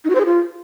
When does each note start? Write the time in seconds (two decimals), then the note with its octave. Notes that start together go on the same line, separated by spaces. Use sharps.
0.05 D#4
0.10 F#4
0.15 C5
0.20 G#4
0.25 F4